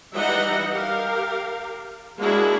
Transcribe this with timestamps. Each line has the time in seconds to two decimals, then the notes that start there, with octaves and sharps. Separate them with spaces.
0.14 E3 G3 D#4 D#5 E5 F#5
0.70 G4 A#4 F5
2.19 G#3 A#3 D4 E4 F#4 G#4